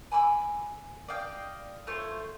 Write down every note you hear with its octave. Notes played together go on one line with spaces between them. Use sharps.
G#5 B5 D6 E6
D5 D#5 F5 G5
A3 F4 C5 C#5